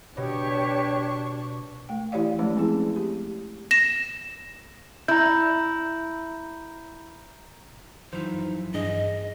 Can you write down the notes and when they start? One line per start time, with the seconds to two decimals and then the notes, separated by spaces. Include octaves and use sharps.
0.17 B2 D4 G4 C#5 C#6
1.89 A3 G5
2.12 E3 E4 G4 C#5 D5 F5
2.39 E3 F3 G#3 A3 C#4
2.57 C4 C#4 E4 G#4
2.96 G4
3.71 A#6 E7
5.08 E4 A#5 G6
8.13 F#2 E3 F3 D#4 C5
8.74 G2 G#4 D#5